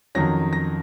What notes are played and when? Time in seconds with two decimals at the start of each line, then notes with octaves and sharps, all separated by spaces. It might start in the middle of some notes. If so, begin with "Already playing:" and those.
0.15 F2 D#3 F#3 C#4 A#6
0.53 A#6